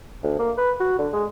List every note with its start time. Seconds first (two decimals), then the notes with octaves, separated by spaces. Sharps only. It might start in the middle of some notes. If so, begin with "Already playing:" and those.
0.24 D2
0.39 A#3
0.58 B4
0.80 F#4
0.99 D3
1.13 G#3